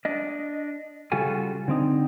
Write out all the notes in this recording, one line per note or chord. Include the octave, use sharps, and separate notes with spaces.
D4 D#5
C#3 G3 F4 F#4 A4 G#5
D3 C4 D#4